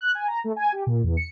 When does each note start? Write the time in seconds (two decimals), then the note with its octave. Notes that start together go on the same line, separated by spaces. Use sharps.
0.01 F#6
0.15 G#5
0.28 A#5
0.44 A3
0.56 G#5
0.72 G4
0.86 A#2
1.04 E2
1.17 C#7